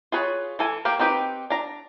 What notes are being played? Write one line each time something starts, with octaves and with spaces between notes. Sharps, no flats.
F4 G#4 B4 C#5
E3 A4 G#5
A#3 G4 F5
C4 D#4 G4 B4
D4 A#5